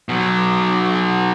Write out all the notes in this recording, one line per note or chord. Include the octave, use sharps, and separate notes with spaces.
B2 F#3